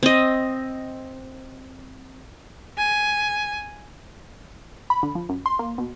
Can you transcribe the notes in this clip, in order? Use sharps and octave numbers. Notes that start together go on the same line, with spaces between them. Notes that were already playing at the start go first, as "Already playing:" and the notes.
C4 D#5
G#5
B5
D3
F3
F#2
C6
A#3
B2